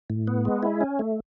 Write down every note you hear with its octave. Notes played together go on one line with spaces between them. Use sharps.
A2
B3
G#3
E4
C#4
A3